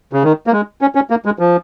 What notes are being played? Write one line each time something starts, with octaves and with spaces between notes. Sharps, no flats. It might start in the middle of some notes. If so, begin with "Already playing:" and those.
C#3
D#3
A#3
G#3
C#4
C#4
A#3
G#3
F3